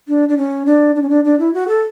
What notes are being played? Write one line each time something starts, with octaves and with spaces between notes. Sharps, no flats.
D4
D4
C#4
D4
D4
C#4
D4
D4
E4
F#4
A4